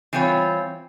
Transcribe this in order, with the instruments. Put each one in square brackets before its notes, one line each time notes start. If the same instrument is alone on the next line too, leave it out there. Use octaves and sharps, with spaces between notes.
[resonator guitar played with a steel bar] E3 G3 C4 F4 C#5